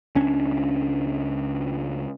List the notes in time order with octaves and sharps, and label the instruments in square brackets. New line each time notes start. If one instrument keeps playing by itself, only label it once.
[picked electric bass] C#2 C#4 D4